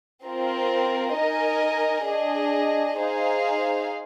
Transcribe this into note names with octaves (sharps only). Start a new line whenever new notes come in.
C4 F4 A#4
D#4 A#4 D#5 G#5
D4 G#4 D#5
D#4 G#4 C5 F5